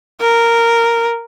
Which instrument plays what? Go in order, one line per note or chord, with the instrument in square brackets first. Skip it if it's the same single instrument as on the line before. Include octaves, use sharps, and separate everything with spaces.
[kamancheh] A#4